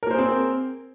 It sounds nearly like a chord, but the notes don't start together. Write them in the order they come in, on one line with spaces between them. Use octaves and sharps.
A#4 A#3 C5 G#4 C4